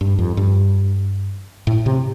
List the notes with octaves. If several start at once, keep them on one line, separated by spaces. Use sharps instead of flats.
G2
F2
G2
A2
C3